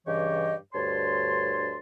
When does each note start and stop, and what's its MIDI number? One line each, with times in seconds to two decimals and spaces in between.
0.07 0.55 43
0.07 0.55 49
0.07 0.55 52
0.07 0.55 67
0.07 0.55 73
0.07 0.55 75
0.74 1.78 38
0.74 1.78 43
0.74 1.78 73
0.74 1.78 81
0.74 1.78 84